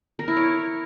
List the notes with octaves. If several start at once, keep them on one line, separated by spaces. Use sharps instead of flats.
A#4
E4
C#5